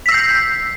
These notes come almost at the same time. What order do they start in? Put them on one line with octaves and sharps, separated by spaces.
B6 E6 C7 G6